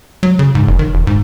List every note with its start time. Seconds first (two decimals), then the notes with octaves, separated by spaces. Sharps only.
0.23 F#3
0.39 C#3
0.55 G#2
0.67 F1
0.79 D#3
0.94 E1
1.07 G#2